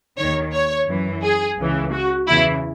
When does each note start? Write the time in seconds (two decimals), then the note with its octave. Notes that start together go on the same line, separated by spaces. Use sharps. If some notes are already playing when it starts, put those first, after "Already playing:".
0.18 D#2 D#3 C#5
0.53 C#5
0.88 F#2 E3
1.23 G#4
1.58 C#2 C#3 E3
1.92 F#4
2.27 E2 C#3 E3 E4